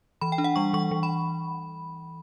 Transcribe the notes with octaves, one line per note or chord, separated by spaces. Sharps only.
E3 B5
G5
D4
F#5
G3 C#6
E3 C#6
E3
B5